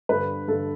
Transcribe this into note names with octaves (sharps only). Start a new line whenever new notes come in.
G2 D3 B4
G2 D3 A4